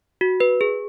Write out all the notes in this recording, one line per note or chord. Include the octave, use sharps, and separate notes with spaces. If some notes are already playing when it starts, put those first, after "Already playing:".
F#4
B4
G#4